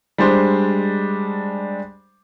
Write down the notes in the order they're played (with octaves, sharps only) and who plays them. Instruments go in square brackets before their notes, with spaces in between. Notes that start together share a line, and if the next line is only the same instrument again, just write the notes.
[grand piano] G3 G#3 D4 C5